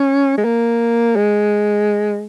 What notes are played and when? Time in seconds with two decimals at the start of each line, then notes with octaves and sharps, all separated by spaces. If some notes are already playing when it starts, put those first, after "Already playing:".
Already playing: C#4
0.38 G#3
0.45 A#3
1.16 G#3